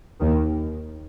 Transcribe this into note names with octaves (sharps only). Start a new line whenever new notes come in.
D#2 D#3